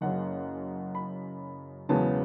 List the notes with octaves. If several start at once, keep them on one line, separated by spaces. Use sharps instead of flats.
F#1 F#2 C#3 F#5
B5
E1 E2 C#3 F#3 B3 A5